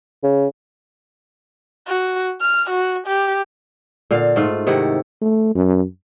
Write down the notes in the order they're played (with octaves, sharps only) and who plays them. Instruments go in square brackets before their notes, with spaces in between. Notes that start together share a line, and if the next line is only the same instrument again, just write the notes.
[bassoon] C#3
[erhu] F#4
F6
F#4
G4
[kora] A#2 D3 F5
G#2 A3 F4
C3 D#3 E4 F#5
[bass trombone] A3
F#2